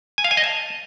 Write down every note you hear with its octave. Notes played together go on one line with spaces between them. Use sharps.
G#5
F5
G#5
D#5
A5